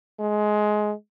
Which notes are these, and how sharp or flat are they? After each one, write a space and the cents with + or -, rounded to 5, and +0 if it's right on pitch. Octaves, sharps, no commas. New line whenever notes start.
G#3 +20